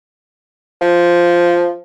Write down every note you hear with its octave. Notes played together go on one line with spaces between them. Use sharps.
F3